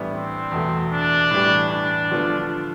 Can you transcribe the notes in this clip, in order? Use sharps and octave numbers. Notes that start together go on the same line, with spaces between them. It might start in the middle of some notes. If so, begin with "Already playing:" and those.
Already playing: A2 E3 G3 B3 D4
C4
E2 B2 A3
D4
A2 E3 G3
D4
D3 F3 B3 F4